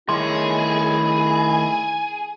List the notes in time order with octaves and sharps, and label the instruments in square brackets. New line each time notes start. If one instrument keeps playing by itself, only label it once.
[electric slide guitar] D#3 A3 C#5 [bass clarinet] E4 [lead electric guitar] G#4 [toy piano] C6